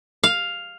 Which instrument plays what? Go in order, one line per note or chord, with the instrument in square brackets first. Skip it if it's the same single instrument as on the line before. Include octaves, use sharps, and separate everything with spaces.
[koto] F5